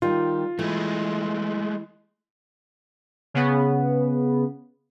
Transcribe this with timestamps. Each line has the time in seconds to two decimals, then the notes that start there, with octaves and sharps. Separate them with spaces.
0.02 D#3 G3 F4
0.59 E3 G#3 A3
3.34 C#3 B3